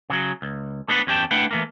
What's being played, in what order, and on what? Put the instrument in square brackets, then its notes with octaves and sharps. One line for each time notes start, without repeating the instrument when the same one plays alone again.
[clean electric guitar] C#3 E3 F#3
C#2
A3 B3 D4 E4 A4 B4
E2 C#4 G4 G5 A5
A3 D4 E4 B4 F#5 G5
E3 A3 A#3